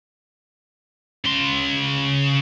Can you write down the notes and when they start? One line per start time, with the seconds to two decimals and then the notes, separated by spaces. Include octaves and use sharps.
1.25 C#3 C6